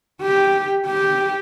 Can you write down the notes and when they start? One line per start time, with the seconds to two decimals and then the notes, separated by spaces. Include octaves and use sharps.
0.22 G4
0.86 G4